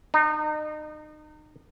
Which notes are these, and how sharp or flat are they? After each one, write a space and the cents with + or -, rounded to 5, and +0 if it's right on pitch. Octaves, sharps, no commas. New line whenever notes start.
D#4 -35